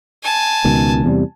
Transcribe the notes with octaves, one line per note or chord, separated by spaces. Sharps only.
G#5 A5
C#2 B2 D#3
E2 C3 G3